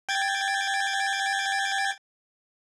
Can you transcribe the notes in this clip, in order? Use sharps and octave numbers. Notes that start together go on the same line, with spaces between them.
G5 G#6 A6